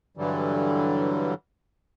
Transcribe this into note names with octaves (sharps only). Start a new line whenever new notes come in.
G2 D3 E3 F#3 G3